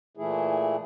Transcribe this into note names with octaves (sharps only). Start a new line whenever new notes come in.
A#2 E3 A3 E4 G#4